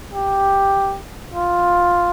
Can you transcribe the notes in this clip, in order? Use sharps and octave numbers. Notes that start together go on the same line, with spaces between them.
G4
F4